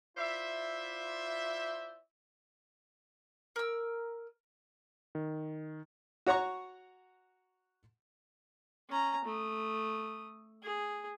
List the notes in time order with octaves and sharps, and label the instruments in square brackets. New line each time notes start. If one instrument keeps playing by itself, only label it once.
[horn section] E4 F4 C5 D5 E5
[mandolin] A#4 E6
[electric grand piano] D#3
[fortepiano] F#4 C#5 F#5 A#5 C#6
[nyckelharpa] C#4 A#5
A3 D#6
G#4